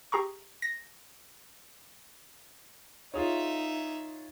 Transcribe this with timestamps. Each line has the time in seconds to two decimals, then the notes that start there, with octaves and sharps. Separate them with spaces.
0.12 G4 G#4 A#5 C#6
0.62 A#6
3.14 D#4 F4 G#4 C#5 E5